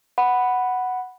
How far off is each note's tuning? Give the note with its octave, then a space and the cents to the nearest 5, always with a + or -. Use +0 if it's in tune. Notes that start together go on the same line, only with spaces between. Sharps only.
F#5 +0 B5 +0